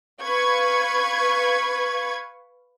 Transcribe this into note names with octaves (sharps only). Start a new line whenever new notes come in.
B4 F5 C#6 G#6